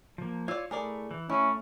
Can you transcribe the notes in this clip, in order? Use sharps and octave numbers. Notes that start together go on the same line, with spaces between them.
F3 A#3
F4 C#5 D5 E6
A3 E4 G#4 A#4 D5
E3
A3 C#4 E4